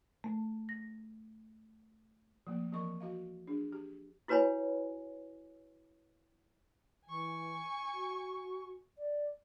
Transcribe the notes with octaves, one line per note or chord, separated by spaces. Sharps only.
A3
A#6
F3 A3 A#3
E3 F3 C4 A#4 D#5 C#6
F#4 D#5 F5
D4 G#4
G4
E4 F#4 B4 C#5 G#5 B5
E3 G#5 C#6
F#4
D5